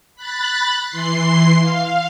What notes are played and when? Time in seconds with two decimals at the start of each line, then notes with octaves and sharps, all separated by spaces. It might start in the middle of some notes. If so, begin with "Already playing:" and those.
0.15 B5 F#6 A6
0.88 E3 C6 C7
1.60 F5